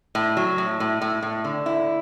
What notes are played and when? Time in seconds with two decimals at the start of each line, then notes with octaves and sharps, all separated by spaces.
0.15 A2
0.37 F#3
0.58 A2
0.80 A2
1.01 A2
1.22 A2
1.44 D3
1.66 E4